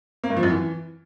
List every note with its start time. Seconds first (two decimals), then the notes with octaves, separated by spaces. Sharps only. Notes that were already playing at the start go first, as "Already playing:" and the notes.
0.24 A#3
0.30 G2
0.37 F3
0.43 F#2
0.50 E3